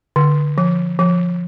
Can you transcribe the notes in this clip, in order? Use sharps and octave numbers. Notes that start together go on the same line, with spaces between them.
D3
F3
F3